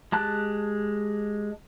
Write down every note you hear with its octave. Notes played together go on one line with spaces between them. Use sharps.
G#3 G4 A5 F#6